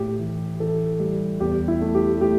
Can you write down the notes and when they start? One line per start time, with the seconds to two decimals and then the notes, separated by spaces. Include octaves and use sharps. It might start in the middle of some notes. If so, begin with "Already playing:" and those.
Already playing: A2 G4
0.19 E3
0.59 E3 A4
1.00 G3
1.40 E2 G4
1.68 E4
1.81 A3
1.95 G4
2.21 A3 G4